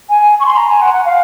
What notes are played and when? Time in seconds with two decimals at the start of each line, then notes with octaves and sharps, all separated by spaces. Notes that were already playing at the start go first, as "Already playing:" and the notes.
0.09 G#5
0.39 C#6
0.45 C6
0.57 A#5
0.69 G#5
0.80 F#5
0.92 F#5
1.05 F5